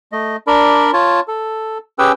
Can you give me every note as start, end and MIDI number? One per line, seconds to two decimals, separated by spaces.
0.12 0.36 57
0.12 0.36 75
0.47 0.91 62
0.47 0.91 70
0.47 0.91 74
0.47 0.91 83
0.93 1.20 65
0.93 1.20 73
0.93 1.20 81
1.28 1.78 69
1.99 2.12 61
1.99 2.12 67
1.99 2.12 68
1.99 2.12 71
1.99 2.12 79
1.99 2.12 88